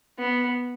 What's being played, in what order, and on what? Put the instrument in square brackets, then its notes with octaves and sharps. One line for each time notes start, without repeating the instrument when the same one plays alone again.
[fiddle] B3